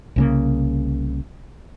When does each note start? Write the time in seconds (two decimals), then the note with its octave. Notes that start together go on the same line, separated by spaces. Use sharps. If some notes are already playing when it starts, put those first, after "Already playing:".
0.16 C2 C#3 A#3